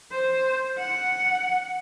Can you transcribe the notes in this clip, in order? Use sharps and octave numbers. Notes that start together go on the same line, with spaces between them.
C5
F#5